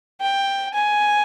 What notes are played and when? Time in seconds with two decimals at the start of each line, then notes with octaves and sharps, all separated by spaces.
0.21 G5
0.74 G#5